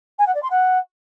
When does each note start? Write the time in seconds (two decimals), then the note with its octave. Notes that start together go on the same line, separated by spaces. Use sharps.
0.18 G#5
0.26 F#5
0.34 D5
0.42 C6
0.50 F#5